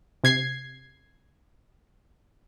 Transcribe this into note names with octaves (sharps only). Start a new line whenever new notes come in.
C3 G#6 C7